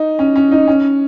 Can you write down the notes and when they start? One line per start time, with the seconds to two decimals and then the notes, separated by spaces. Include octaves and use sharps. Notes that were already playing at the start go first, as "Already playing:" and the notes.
Already playing: D#4
0.19 C#4
0.36 C#4
0.52 D#4
0.68 C#4